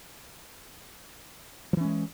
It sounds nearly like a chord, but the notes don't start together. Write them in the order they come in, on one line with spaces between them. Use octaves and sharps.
F3 E3 C#4 G#3